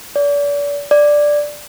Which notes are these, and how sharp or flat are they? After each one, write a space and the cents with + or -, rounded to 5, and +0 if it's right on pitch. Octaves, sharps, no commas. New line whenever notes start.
D5 -35
D5 +0